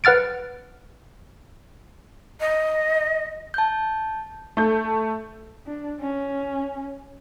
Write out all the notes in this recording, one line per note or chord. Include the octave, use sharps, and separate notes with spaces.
B4 F#5 F6 A6 D7
D#5
A5 G6
A3 G6
D4
C#4